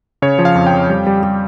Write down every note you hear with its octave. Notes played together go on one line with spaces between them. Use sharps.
C#3 C#5
F3
F5
F2
G5
F2
G3
G3
G3